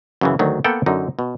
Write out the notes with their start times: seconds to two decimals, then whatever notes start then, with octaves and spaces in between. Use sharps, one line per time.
0.21 F#2 C#3 E3
0.39 D2 D#3 F#3
0.64 A#3 B3 A4 F#5 G5
0.86 F#2 D3 D#4
1.19 B2